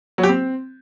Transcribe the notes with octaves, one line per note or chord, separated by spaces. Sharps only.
F#3
G4
C4